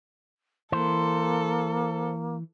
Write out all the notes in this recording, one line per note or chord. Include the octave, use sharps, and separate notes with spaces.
E3 A#3 A4 C5